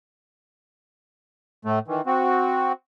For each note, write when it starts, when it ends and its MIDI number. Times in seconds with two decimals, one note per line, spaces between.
1.65 1.79 45
1.65 1.79 57
1.88 2.01 51
1.88 2.01 52
2.06 2.72 60
2.06 2.72 66